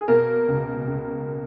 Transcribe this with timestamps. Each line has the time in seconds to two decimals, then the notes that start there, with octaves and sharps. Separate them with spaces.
0.01 G#4
0.08 B2 A#3 A#4
0.48 C#2
0.87 C#2